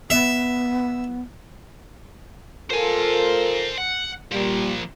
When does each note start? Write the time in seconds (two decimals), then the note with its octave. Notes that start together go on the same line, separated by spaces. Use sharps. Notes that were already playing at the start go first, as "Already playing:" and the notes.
0.10 B3 E5
2.71 F4 A4 A#4 C5 G#5
3.78 F#5
4.32 A#2 F3 G3 A#3